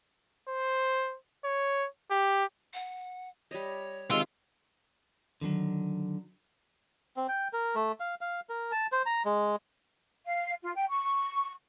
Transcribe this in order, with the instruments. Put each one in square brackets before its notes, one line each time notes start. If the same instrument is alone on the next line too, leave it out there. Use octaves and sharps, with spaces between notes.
[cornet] C5
C#5
G4
[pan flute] F#5
[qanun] G3 D#5 [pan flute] C#5
[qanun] C3 D#3 C4 [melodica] G#3 E6 [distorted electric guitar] F4
[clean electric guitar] D3 D#3 F3 F#3
[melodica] C4
G5
A#4
A3
F5
F5
A#4
A5
C5
A#5
G#3
[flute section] F5
F4
G5
C#6